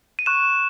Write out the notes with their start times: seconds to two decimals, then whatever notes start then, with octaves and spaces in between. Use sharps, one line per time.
0.19 D#7
0.26 C#6 F#6 E7